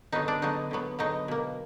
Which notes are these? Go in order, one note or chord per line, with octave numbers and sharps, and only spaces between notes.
D3 F#3 B3 D#4
D4
D3 F#3 B3 D#4
D3 F#3 B3
D3 F#3 B3 D#4
B2 A#3